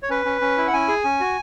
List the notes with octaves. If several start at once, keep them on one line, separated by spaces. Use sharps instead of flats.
C#5
C#4 B4
C#4
C#4
E4
F#5
C#4 G#5
G#4
C#4
F#4